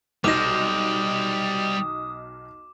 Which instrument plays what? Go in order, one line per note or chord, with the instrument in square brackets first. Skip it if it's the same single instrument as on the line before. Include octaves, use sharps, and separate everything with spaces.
[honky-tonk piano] B1 D#4 A#6 [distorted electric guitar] G3 C5 [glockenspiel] D6 E7 [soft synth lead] D#6